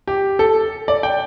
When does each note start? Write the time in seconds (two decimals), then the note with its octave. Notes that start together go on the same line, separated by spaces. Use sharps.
0.07 G4
0.39 A4
0.88 D5
1.03 G5